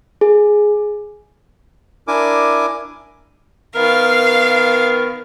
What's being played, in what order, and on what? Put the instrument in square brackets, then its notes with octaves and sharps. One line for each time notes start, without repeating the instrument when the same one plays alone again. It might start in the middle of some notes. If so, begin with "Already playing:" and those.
[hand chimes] G#4
[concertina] D4 E4 A#4 G#5 D6
[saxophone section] D#3 B3 A#4 [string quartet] F5